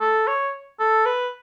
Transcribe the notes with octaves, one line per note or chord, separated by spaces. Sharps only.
A4
C#5
A4
B4